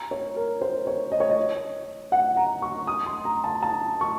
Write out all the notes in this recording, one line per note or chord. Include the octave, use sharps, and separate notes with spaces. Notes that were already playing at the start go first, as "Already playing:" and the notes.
Already playing: A#5
C#5
A#4
C5
C#5
D#5
C#5
D#5
F#5
A#5
C#6
D#6
C6
A#5
A5
A5
C#6